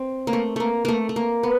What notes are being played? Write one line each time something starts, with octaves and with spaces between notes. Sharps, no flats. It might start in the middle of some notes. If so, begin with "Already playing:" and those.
Already playing: C4
A#3
A3
A3 A#3
A3 A#3
A3
A#3
B3